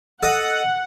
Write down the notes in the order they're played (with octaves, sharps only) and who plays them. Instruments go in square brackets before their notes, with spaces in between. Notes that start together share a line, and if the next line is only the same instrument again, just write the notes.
[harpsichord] A4 D#5 [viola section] F#5